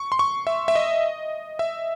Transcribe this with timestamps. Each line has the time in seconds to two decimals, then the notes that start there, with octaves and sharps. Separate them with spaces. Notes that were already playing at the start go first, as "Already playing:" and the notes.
Already playing: C#6
0.12 C6
0.19 C#6
0.47 E5
0.68 E5
0.75 D#5
1.59 E5